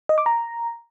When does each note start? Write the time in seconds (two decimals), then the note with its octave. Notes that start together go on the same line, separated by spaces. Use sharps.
0.09 D#5
0.18 D6
0.26 A#5